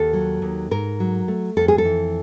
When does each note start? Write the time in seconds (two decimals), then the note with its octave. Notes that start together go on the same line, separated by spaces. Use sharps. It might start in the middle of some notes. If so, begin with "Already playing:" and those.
Already playing: D#2 A4
0.13 F#3
0.42 D#2
0.71 G#2 A#4
1.00 F#3
1.28 A3
1.57 F2 A4
1.68 G#4
1.78 A4
1.85 E3